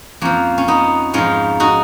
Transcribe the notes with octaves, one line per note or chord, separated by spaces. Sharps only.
F2 F3 A#3 C#4
C#4
B3 D#4
G#2 F3 C#4 F4
D#4 F#4